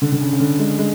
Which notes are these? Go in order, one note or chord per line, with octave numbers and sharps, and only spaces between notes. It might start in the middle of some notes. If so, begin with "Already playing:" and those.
D3
D3
C#3
C#3
D3
G#3
G#3